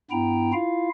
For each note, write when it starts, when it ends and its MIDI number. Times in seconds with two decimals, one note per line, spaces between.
0.11 0.53 43
0.11 0.53 59
0.11 0.53 64
0.11 0.53 79
0.11 0.53 82
0.53 0.89 64
0.53 0.89 65
0.53 0.89 77